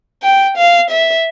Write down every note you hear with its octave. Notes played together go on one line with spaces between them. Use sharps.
G5
F5
E5